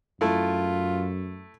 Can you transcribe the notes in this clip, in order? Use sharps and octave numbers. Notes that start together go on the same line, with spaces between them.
F#2 A3 E4 F4